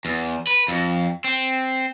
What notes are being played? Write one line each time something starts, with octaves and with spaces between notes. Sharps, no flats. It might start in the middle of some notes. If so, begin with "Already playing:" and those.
E2
B4
F2
C4